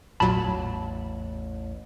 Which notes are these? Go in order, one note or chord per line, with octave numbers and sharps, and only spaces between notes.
A1 E2 A#2 F#3 A5 B5